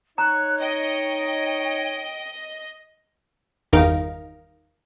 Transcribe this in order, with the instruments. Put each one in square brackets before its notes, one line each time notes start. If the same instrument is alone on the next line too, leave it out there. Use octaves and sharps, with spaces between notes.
[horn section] D#4 C#5 [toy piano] A#5 [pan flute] F#6
[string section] D#5 [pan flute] G5
[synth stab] G1 E2 D#3 D#4 A#4 F5